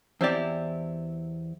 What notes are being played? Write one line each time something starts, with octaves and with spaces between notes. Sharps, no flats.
E2 C4 E4 G4 D5